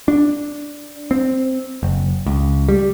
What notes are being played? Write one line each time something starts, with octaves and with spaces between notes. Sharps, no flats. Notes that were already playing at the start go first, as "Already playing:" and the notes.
D4
C4
F#1
C#2
G3